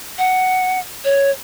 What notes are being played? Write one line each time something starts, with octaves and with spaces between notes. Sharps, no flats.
F#5
C#5